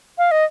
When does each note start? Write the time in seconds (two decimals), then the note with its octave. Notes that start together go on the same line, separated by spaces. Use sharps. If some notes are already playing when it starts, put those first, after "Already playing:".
0.18 F5
0.31 D#5